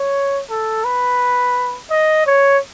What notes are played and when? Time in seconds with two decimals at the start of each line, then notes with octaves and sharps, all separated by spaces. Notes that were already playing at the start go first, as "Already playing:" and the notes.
Already playing: C#5
0.50 A4
0.85 B4
1.90 D#5
2.26 C#5